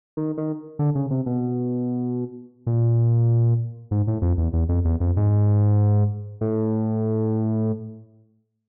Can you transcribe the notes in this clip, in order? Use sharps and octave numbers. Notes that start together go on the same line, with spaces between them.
D#3
D#3
D3
C#3
C3
B2
A#2
G#2
A2
F2
E2
E2
F2
E2
F2
G#2
A2